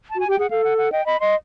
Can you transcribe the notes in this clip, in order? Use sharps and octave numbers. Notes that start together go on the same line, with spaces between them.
A5
F#4 G#5
G4 G5
G#4 F#5
A4 F5
F#5
F#5
D#5 G5
D#5 B5
D#5 C6